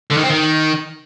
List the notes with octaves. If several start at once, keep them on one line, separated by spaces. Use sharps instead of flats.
D3
D#3
C4
D#3